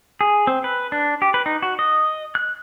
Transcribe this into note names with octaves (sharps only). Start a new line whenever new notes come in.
G#4
C4
B4
D4
G4
B4
D#4
F#4
D#5
F#6